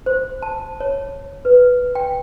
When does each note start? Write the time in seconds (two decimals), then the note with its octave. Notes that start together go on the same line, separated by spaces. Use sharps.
0.06 C5
0.42 A5
0.80 C#5
1.45 B4
1.95 G5